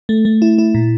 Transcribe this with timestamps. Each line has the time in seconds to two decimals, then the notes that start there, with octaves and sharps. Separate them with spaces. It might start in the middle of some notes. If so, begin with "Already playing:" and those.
0.09 A3
0.25 A3
0.42 E4
0.58 E4
0.74 A#2